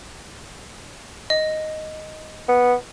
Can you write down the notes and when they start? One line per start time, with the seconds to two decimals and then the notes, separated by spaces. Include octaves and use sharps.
1.30 D#5
2.48 B3